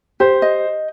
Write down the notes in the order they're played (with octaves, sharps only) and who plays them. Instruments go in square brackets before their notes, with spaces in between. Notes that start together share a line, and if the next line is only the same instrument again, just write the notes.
[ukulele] G4 [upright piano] C5
[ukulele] D#5